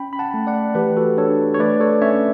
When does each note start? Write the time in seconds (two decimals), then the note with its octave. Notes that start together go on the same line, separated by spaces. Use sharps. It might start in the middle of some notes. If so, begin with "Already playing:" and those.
Already playing: C#4 G5 B5
0.13 B5
0.19 F#5 A5
0.34 A3
0.47 D5 F#5
0.75 E3 G4 B4
0.96 F#4 A4
1.17 D4 A4 C#5
1.54 C#5
1.59 A3 B4 D5
1.80 A4 C#5
2.02 C#4 C#5 E5